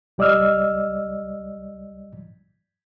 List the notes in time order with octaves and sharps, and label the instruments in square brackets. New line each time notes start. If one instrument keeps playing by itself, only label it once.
[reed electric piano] C2 G3 D5 D#5 E6 F6